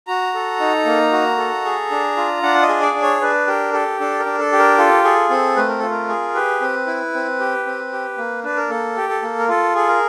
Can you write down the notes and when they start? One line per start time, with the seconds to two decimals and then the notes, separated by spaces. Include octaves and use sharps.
0.07 F#4 A#5
0.34 A4
0.60 D#4
0.85 A#3
1.12 F#4
1.38 A4
1.65 G#4
1.91 D4
2.17 F4
2.43 D4 F#5
2.62 D#5
2.68 G#4
2.82 D5
2.95 D4
3.02 C#5
3.22 D4 B4
3.47 G4 A#4
3.73 G4 A4
4.00 D4 A4
4.20 A#4
4.26 D4
4.39 A4
4.52 G4
4.59 A#4
4.78 F4 A4
5.04 G#4 A4
5.30 C4 A4
5.56 A3 B4
5.68 A#4
5.79 F4 A4
5.91 A#4
6.08 G#4
6.35 G4 B4
6.61 C4
6.87 E4
7.14 C4
7.39 G4
7.66 C4
7.92 G4
8.18 A#3
8.44 D4 B4
8.57 A#4
8.70 A#3 A4
8.97 G4
9.09 A4
9.22 A#3
9.39 A#4
9.48 F4 A4
9.75 G#4 A4
9.88 A#4